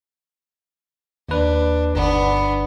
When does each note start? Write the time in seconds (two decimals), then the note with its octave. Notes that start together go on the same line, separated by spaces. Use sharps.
1.29 D#2 D4 B4
1.94 G1 B3 D4